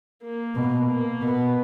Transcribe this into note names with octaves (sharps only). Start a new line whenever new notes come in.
A#3
B2
A#3
B2 B3